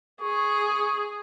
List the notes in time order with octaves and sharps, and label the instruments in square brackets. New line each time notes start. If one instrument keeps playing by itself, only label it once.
[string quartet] G#4 [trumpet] C#6